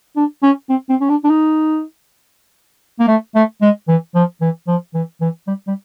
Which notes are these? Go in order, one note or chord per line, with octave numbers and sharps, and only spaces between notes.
D4
C#4
C4
C4
C#4
D4
D4
D#4
A#3
A3
A3
G#3
E3
F3
E3
F3
E3
E3
G3
G3